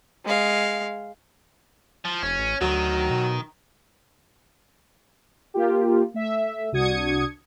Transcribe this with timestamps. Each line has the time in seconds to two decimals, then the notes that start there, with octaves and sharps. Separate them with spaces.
0.25 G#3 F5
2.05 F3
2.23 F1 C#4
2.38 A1
2.61 D2 D#3 F#3
3.10 B2
5.54 A#3 F4 G4
6.14 A3 E5
6.72 C2 D4 F#4 D#6 G#6 C#7